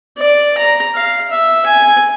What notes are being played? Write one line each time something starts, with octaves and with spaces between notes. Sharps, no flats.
D5
A#5
F5
E5
G#5